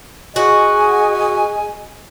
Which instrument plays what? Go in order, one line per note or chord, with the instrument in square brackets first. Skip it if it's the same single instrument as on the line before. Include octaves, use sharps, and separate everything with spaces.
[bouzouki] F#4 [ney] G#4 [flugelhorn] D#5 [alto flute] G#5